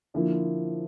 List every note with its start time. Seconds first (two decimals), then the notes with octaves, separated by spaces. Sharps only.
0.14 D3 F3 A#3 E4